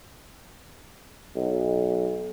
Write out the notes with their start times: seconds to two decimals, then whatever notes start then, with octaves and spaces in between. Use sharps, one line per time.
1.36 B1